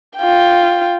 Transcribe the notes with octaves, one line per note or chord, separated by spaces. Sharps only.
F4 G5